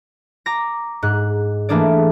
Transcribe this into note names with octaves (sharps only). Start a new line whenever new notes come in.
A#5 D6 A#6
G#2 F#6
E3 A3 A#3 D4 G#4 D5